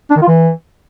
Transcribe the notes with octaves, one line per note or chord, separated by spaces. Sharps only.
D4
D#3
F4
E3